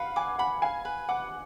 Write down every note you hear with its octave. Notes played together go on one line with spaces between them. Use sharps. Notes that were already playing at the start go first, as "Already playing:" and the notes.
Already playing: B4 F5 F#5
G#5 D6
F#5 B5
F5 G#5
B4
F#5 D6